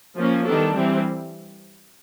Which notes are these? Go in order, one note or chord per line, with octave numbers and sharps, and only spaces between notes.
F3 A#3 C#4
D#3 G3 B3 D4 A4
E3 G3 C4